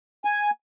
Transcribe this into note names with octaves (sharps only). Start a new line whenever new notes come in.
G#5